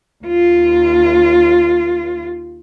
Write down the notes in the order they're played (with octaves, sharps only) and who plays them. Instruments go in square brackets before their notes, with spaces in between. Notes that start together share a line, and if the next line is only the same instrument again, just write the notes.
[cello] D#2 F4